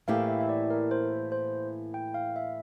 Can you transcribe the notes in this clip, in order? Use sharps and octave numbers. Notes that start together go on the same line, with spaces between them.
A2 E3 A#3 E4 G4 F5
E5
E5
D5
A#4
C5
C5
G5
F5
E5